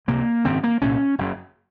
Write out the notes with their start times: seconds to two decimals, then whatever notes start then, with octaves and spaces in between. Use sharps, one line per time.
0.08 C#2 C3 A#3
0.44 G#1 F#2 C#3 C4
0.63 A#3
0.81 C2 A#2 C#4
1.18 F#1 F#2 C#3